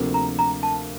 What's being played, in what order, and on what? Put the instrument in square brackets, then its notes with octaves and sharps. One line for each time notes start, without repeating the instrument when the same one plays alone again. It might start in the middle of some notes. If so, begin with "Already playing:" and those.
Already playing: [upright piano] D2 C3 F3 A#3
[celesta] A#5
A#5
A5